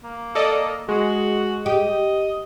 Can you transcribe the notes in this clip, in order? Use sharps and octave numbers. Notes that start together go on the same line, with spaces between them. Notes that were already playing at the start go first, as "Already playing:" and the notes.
A#3
A4 D5 D#5
G#3 F#4
G4 D#5